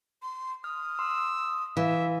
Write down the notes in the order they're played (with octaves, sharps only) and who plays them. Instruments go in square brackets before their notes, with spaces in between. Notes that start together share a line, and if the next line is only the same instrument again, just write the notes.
[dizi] C6
[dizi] D#6 [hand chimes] F6
[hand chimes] C6 [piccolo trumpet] E6
[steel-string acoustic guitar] E3 [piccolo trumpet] E5 [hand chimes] F5